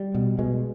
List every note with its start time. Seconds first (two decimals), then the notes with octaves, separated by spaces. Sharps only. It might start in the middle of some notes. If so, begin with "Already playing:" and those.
Already playing: G3
0.14 B2
0.39 B2 G#3